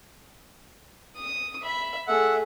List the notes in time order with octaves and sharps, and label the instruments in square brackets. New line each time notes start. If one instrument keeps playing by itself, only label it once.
[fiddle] D#6
E5 B5
[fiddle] A3 G#4 [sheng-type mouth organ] E5 F#5